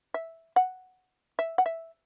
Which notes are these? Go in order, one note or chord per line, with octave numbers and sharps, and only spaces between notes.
E5
F#5
E5
F#5
E5